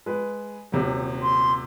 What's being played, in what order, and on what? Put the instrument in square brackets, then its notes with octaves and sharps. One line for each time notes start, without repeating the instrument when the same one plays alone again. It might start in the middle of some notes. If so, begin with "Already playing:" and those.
[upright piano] G#3 B4
D#1 C3 F#3
[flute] C6